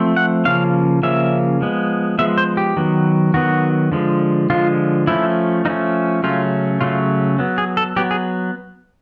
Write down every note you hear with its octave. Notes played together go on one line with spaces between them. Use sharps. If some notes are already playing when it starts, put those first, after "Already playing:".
Already playing: F3 A3 C4
F#5
C#3 F3 A#3 C#4 F5
C#3 F3 A#3 C#4 E5
F3 G#3 B3
F3 G#3 B3 E5
C5
G4
D#3 F#3 B3
D#3 F#3 B3 F#4
D3 F3 G#3
D3 F3 G#3 F4
F3 A3 C#4 E4
F3 A3 C#4 D#4
C#3 F#3 A3 C#4 F4
C#3 F#3 A3 C#4 F4
F#3 B3
G#4
A4
F#3 B3 G4
G#4